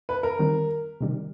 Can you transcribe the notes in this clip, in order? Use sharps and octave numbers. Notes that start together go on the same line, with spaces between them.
B4
A#4
D#3 G3 C4
C3 D#3 G3